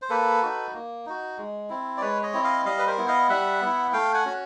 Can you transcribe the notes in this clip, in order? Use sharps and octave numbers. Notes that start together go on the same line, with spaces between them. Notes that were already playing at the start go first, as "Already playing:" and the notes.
C5
A#3 A4 B4
D#4 F#4
A#3
D#4 F#4
G#3
C4 E4
D5
G#3 B4 C#5
C#5 D#5
C4 E4
D#5 F5
G3 D#5 F5
B4
A#4 C5
B3 E4
D#5 F5
G3 E5 F#5
B3 E4
A3 F5 G5
F#5 G#5
C#4 F#4